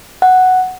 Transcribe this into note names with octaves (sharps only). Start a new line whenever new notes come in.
F#5